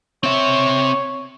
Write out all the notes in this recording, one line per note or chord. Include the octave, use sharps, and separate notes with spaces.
C4 C#5 E5